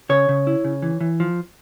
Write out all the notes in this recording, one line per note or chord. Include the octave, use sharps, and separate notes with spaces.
C#3 C#5
C#3
E4
C#3
E3
E3
F3